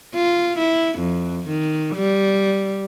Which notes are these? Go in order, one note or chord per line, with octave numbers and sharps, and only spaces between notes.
F4
E4
F2
D#3
G3